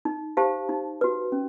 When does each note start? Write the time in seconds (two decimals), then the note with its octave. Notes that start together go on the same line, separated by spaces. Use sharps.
0.05 D#4
0.37 G4 C5 F5 A5
0.69 D#4
1.01 F#4 B4
1.32 C#4